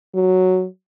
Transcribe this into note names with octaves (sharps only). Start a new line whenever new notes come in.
F#3